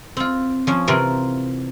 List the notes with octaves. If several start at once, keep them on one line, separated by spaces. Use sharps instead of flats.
C4 F4
F3 C#4
C3 E3 C4 F4 A#4